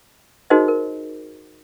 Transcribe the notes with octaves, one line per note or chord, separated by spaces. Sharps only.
D#4 F#4 G#4 A#4 C5 D#5
A#4